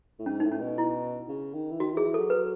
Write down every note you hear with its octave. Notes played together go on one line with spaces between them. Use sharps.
A2
G#2 C#4
D#4
A2
C#4
B2
E4
C#3
D#3
E3
D#3 F#4
E3
G#4
E3
F#3 A4
B4